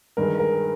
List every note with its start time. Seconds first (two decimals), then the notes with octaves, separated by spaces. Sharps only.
0.17 G2 D#3 G#3 A#4
0.39 A#4